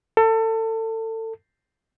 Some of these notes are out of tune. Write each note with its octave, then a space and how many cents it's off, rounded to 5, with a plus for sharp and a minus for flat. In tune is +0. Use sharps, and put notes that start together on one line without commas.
A4 +30